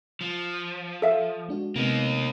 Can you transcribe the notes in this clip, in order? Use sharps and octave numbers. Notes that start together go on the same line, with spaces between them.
F3
A4 E5 F5
G#3 D4 F#4
C3 G#3 A#3 B3 D#4